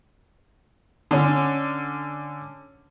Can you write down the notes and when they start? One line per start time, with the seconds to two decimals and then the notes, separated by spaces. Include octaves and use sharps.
1.11 D3 C#4